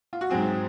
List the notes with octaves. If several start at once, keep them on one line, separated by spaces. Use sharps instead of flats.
F4
F#4
G#2 F#3 C4 G#4